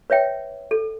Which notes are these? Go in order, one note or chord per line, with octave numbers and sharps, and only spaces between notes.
B4 C#5 E5 G5
A4